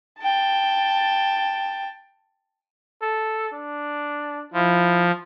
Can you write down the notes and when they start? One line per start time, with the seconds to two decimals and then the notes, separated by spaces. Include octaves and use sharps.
0.19 G5 A5
3.02 A4
3.53 D4
4.54 F3 E4